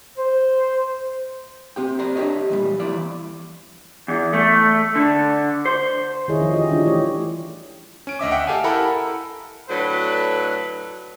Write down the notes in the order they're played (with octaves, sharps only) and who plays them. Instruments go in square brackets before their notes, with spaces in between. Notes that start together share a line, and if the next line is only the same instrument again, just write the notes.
[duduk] C5
[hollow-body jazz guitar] C4 G4 G5
C5 D5 A#5
D4 G4 A4 C#5 D#5
E2 A#2 G3
E3 F3 E4 D5
[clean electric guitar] E2
A3
D3
C5
[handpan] D#3 E4 G#4 C#5 D#5
F3 C#4
G4 D#5
E3 G3 D4 F4
A3 G4 C#5
[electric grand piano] C#4 D7
D2 D#5 E5 D6
E5 F#5 G5
G4 A4 F5 G#5
E4 A4 A#4 F#5 G5 B5
[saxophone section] A2 D3 F#3 [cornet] B4